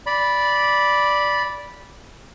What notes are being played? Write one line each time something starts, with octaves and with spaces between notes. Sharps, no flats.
D5 B5